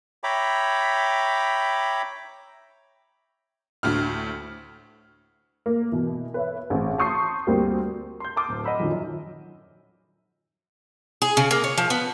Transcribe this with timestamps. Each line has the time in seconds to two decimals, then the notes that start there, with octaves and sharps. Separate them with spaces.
0.24 C#5 E5 G5 A#5 B5 D6
3.83 D2 A2 F6
5.66 A#3
5.92 B2 E3
6.34 B4 C#5 E5
6.70 A1 C#3 C4
6.98 A5 C6 C#6 D#6 G6 C7
7.47 D2 G3 A#3 C4
8.20 C6 G6
8.36 A5 C6 D6 D#6 F6
8.49 D1
8.64 D#5 F#5 B5 E6
8.79 F2 A#2 D#3 F#3 C#4
8.91 F#2
11.22 G#4
11.37 C#3
11.51 A#3
11.64 C#5
11.77 F3
11.90 B3